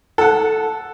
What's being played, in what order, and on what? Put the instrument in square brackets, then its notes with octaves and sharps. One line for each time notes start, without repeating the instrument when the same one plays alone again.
[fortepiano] A4 F#5